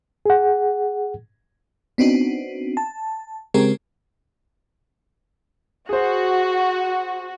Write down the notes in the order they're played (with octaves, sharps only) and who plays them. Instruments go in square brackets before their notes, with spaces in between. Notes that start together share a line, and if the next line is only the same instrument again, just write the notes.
[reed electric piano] G#4 F#5
[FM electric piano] B3 C4 D4 D#4 F#4
A5
C#3 G#3 C4 G4 G#4 A#4
[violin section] F#4 [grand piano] G#4 C5